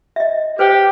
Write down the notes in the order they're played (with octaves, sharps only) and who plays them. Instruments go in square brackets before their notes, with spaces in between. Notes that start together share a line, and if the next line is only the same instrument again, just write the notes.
[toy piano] D#5 E5
[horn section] G4 [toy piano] B4 C5 G5